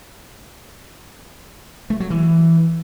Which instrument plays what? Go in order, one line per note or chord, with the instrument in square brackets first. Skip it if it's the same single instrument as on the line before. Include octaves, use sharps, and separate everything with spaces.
[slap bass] A3
F#3
E3